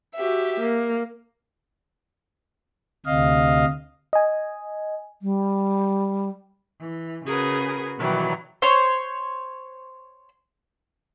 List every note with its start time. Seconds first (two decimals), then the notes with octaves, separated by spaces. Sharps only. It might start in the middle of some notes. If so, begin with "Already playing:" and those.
0.16 F#4 G4 E5
0.60 A#3
3.06 D2 C3 D#5 F5
4.13 D#5 G#5
5.22 G3
6.80 E3
7.25 C#3 F#4 G#4 A#4 B4
7.98 B2 D#3 E3 F#3 G3
8.62 C5 C#5